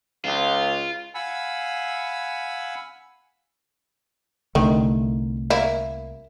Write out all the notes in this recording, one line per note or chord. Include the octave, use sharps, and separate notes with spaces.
C#2 F4
F5 F#5 G#5 B5 E6
C2 D3 D#3 A3
A#3 E4